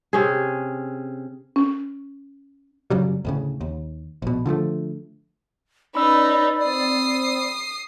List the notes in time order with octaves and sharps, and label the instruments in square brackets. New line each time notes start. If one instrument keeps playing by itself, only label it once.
[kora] C3 C#4 G#4
[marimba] C#4
[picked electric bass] F#2 C#3 F#3 G3
D2 A2 C#3
D#2
A#1 B2
D3 F3 G#3 A3
[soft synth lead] C#4 [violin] D#4 B4 [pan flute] D5 [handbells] B5 E6
[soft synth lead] C4 [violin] D#6 C7